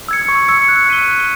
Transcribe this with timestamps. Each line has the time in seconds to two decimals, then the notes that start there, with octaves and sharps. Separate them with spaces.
0.08 E6 G#6 C#7
0.29 C#6
0.48 E6 G#6 C#7
0.68 F#6
0.89 B6 D#7 G7
1.08 F#6